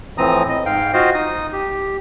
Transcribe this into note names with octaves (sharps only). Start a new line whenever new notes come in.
A2 E3 F3 C4 A#5 D#6
D#5
G#2 F5 G5
F4 F#4 C5 D#5 F5
D#4 D#6
G4